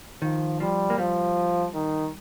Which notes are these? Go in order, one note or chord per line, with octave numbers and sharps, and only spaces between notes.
D#3 F3
F3 G3
A#3
F3 G3
D#3